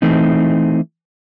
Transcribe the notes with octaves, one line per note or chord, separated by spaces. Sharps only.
E3 A3 C4 D#4